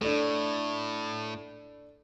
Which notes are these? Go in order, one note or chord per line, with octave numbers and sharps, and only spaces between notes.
A2 D4 A4